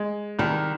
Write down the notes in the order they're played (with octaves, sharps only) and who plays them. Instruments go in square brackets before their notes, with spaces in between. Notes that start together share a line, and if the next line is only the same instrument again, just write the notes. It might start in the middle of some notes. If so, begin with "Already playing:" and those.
Already playing: [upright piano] G#3
[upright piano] C2 [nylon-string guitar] D#3